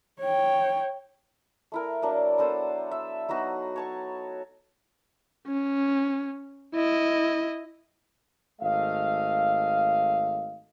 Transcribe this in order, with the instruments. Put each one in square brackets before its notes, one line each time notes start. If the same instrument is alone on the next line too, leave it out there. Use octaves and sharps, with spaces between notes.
[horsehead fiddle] C#5 G5
[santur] A3 E4 A#4
F#3 A#3 D4
B3 D4 A4 C5
E5
F#3 B3 D#4 F#4
C#5 A5 C#6
[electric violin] C#4
E4 D#5
[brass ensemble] G#1 A3 D#5 F5